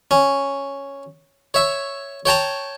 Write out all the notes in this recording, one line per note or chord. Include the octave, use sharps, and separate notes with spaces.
C#4
C#5 E5
C#5 G5 A5 A#5